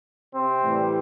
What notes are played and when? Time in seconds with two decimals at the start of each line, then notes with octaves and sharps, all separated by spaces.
0.32 C3 C4
0.62 A2 E3 G3